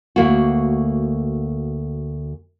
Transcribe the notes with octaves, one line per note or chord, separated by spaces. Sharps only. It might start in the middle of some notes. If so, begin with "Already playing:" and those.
D2 A#3 F#4